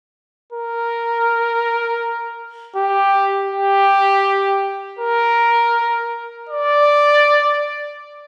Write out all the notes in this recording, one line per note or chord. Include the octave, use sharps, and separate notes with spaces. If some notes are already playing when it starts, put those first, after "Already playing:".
A#4
G4
G4
A#4
D5